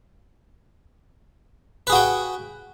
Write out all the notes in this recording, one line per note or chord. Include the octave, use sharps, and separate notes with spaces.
F#4 G#4 B4 G5